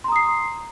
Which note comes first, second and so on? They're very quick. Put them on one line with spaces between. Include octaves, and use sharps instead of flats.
C6 A#5 D#6 C7